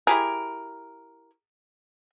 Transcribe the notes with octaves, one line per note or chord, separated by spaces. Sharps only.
E4 G4 G#4 A#4